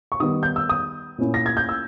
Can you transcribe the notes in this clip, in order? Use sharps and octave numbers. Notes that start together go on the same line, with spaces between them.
C#6
D#3 G3 B3 D#4 D#6
G6
E6
D#6
A#2 A#3 C#4 E4
A#6
G#6
G6
E6